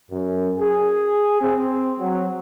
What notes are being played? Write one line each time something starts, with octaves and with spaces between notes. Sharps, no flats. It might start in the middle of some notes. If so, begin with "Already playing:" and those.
F#2
G#4
C4
F#3